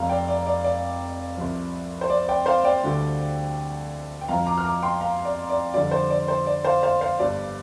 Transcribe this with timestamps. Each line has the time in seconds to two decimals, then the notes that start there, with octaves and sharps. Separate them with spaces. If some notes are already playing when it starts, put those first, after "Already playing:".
Already playing: F1 F2 F3 F5 A#5
0.09 D5 G5
0.28 D5
0.47 D5
0.64 D5
1.37 C2 C3 F3
2.01 C5
2.10 D5
2.29 D5 G5
2.46 C5 F5
2.65 D5 G5
2.83 D2 D3 G3
4.21 G5
4.28 F2 F3 F5 A#5
4.46 A#5 D6
4.58 F6
4.64 A#5 D6
4.83 G5 C6
5.01 F5 A#5
5.25 D5
5.50 D5
5.74 F2 D3 G3 D5
5.91 C5
6.10 D5
6.28 C5
6.46 D5
6.65 C5 F5
6.83 C5 F5
7.01 C5 F5
7.19 G1 G2 G3 D5